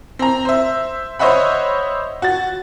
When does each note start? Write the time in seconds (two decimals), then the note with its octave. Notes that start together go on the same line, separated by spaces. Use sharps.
0.19 C4 A#5
0.45 C5 E5
1.19 C5 C#5 D#5 E5 F#5 B5
2.22 F#4 A6